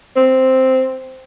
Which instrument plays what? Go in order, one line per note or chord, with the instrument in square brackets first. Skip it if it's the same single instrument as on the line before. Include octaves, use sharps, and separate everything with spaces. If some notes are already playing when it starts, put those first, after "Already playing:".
[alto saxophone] C4